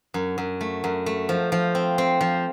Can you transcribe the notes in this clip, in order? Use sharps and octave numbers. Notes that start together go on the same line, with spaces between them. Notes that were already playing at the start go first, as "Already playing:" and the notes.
F#2
F#2
A3
F#2
A3
F3
F3
C4
C4
F3